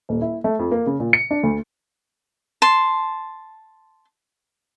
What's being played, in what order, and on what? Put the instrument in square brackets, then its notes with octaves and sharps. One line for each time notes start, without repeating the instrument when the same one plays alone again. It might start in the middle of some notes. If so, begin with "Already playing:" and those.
[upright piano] D#1
E4
A3
F2
A#3
C#3
A#2
C#7
D4
D2
[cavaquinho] A5 C6